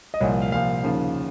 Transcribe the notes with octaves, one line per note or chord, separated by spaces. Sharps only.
D#5
C2 A#2 F3 C#5
F5
C2 A#2 F3 F5
D#2 C#3 F3